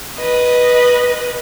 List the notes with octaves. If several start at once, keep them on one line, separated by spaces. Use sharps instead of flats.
B4 D#5